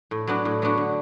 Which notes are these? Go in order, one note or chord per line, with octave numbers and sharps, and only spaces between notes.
A2
F#3 B3 D4 F#4
A2
F#3 B3 D4 F#4
D3